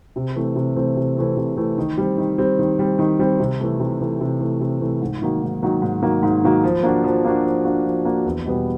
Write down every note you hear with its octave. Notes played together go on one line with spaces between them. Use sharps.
C3
E3 A3 C4
C3
E3 A3 C4
C3
E3 A3 C4
C3
E3 A3 C4
D#3
G3 C4
D#3
G3 C4
D#3
G3 C4
D#3
G3 C4
C3
E3 A3
C3
E3 A3
C3
E3 A3
C3
E3 A3
G#2
D#3 F#3 A#3
G#2
D#3 F#3 A#3
G#2
D#3 F#3 A#3
G#2
D#3 F#3 A#3
F3
A#3 D4 F#4
F3
A#3 D4 F#4
F3
A#3 D4 F#4
F3
A#3 D4 F#4
E2
B2 G3 B3